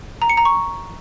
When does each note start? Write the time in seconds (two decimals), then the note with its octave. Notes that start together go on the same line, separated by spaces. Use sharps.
0.22 A#5
0.29 C#7
0.37 A#5
0.45 C#6